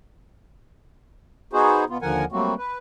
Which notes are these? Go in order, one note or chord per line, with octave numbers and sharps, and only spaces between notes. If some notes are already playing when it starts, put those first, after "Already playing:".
B3 D#4 F#4 G#4 C5
B2 B3 F4
D#2 D3 F3 A#4 F#5 G#5
F#3 G3 A3 A#3 C4 F#4
B4